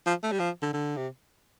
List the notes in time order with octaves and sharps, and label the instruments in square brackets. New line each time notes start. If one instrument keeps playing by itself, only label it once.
[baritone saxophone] F3
A3
G3
F3
D3
D3
C3